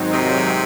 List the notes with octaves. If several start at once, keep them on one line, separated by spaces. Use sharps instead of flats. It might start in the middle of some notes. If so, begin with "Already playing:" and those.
Already playing: G#2 D#3 F#3 C4 D#4
C3